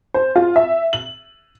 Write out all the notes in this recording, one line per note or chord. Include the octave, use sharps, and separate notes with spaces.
C5
F4
E5
F#7